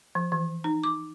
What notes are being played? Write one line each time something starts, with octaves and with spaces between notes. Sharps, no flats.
F3
E3
D#4
D6